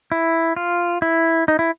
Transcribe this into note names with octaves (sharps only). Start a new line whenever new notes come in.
E4
F4
E4
D#4
E4